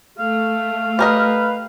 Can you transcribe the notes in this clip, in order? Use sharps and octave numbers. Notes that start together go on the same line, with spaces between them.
A3 F5
G4 A#4 B4 D#5